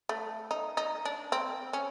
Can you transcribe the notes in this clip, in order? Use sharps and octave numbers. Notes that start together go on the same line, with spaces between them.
A3
D#4
D#4
D4
C4
C#4